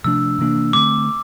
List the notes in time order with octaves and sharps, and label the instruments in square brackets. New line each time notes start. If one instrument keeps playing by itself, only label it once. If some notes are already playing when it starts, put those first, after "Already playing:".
[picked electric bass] C3 F3 A3 D4 [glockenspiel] E6
[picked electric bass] C3 E3 A#3 D4
[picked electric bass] D3 A3 C4 [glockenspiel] D6